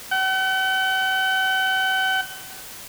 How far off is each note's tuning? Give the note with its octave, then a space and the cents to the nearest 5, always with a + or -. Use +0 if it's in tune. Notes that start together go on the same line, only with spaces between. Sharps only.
F#5 +45